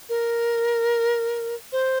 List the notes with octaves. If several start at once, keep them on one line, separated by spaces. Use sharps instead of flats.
A#4
C5